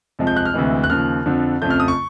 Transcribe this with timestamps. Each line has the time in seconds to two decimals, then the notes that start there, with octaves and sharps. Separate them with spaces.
0.19 F2 C3 F3 G#3
0.27 G6
0.36 F#6
0.45 F6
0.54 D2 C3 E3 G#3
0.84 F#6
0.90 D#2 C#3 F3 F6
1.26 F2 D3 F3
1.62 F2 C#3 F3 A3 G6
1.70 F6
1.80 D#6
1.88 C#6